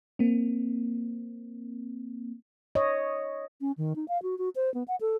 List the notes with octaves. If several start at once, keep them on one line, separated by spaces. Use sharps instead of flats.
A#3 C4
C#5 D#5
C#4
D#3
D#4
F5
F#4
F#4
C5
B3
F#5
A4